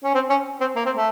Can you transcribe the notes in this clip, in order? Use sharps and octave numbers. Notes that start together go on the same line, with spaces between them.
C#4
C4
C#4
C4
A#3
C4
A3